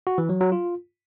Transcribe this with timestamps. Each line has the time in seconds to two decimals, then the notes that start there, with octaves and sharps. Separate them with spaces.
0.07 F#4
0.18 E3
0.29 F#3
0.41 F#3
0.52 F4